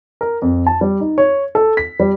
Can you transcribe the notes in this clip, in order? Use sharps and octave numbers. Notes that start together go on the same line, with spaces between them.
A#4
F2
A5
G3
D#4
C#5
A4
B6
G3